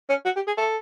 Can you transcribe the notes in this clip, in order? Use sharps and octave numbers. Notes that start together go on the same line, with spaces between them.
C#4
F#4
G4
G#4
A4